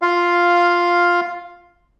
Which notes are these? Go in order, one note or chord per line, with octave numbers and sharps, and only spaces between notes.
F4 F5